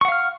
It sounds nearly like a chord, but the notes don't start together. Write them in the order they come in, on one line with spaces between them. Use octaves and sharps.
C#6 F#5 F5 F6